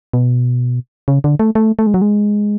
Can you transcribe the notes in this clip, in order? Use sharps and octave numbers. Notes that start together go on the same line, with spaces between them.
B2
C#3
D3
A3
A3
A3
G#3
F#3
G#3